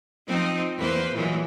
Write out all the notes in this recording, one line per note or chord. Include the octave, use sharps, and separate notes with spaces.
F3 C4 D#4
E2 A#3 B4 C5
A#2 E3 F#3 G#3